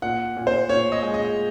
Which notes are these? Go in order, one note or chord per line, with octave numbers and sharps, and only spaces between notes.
A#2 F#5
A#2
C5
A#2 C#5
D#5
G#3
D#5